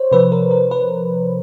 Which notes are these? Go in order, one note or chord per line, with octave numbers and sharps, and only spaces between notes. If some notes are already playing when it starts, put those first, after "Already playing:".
Already playing: C5 C#5
C3 F3 B4
A#4
A#4
B4